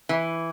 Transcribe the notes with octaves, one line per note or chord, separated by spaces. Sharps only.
E3